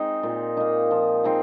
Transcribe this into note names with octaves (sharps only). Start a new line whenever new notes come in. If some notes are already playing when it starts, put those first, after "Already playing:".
Already playing: G#3 C4 D#4 G#4
A#2
A#3 D#4
F3
C4 D#4 G#4